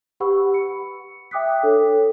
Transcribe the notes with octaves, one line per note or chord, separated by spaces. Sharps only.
G4 B4 F#5 B5 C#6 E6
C#7
E5 G5 D6 D#6 F#6 B6
D4 A4 C#5